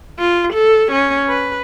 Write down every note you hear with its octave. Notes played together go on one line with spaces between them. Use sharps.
F4
A4
C#4
B4